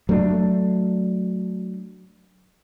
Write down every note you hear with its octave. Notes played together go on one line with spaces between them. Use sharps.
F#3 A3 C#4 D4